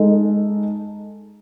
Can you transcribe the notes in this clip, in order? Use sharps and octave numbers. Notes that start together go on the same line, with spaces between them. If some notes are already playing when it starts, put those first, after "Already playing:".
Already playing: G#3 D#4 A4